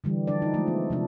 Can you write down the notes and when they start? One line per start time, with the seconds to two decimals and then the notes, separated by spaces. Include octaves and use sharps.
0.04 D3 E3 G3
0.27 F3 D4 D5
0.42 D#4
0.54 F3 G#3 A3
0.67 B3
0.90 C3 F3 D4